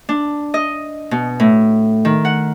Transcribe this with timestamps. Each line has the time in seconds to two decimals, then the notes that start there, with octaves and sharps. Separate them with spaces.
0.09 D4
0.54 D#5
1.11 B2
1.40 A2
2.05 D#3
2.25 F#5